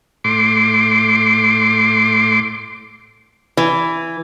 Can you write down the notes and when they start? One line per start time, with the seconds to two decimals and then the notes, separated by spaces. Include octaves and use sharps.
0.24 A2 C6 D6
3.57 E3